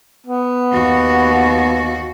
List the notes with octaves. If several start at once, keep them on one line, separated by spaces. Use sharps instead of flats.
B3
D#2 F#4